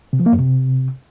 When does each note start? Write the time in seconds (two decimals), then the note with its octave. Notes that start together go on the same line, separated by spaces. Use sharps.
0.13 C3
0.20 F3
0.26 A#3
0.33 F#2
0.39 C3